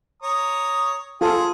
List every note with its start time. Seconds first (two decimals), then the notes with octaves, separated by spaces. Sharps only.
0.22 C#5 A#5 D#6
1.21 F4 G#4 A4